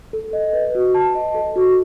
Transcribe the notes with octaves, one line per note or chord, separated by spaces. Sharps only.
A4
D#5
B4
F#4
A5
D#5
A4
F#4